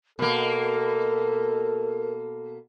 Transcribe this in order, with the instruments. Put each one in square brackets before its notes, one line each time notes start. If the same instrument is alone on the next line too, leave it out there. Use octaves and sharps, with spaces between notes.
[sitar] B2 A#3 [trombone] A4 [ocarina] A#4